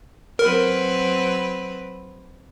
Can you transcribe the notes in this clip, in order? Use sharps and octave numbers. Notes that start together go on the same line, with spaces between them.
F#3 C4 A#4 B4